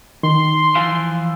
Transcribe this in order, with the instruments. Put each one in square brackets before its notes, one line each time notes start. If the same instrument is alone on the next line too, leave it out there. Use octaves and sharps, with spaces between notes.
[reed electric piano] D#3 [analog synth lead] C6
[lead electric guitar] E3 F3 [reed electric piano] F5